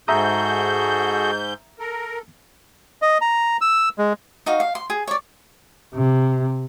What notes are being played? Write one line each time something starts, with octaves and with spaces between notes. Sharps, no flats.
G#2 F#4 G#4 A4 E5 A#5 D#6 G6
A4 A#4
D#5
A#5
E6
G#3
D#4 F#4 F5
F5
C6
G#4
C#5 D5
C3